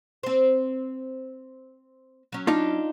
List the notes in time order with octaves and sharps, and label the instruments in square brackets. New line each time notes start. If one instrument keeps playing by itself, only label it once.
[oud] C4 C5
F#3 C#4
[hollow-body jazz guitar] D4 D#4 F4